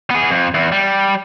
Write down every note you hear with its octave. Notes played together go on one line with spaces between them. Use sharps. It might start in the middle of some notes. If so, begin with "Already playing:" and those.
B3 G#4
F2
E2
G3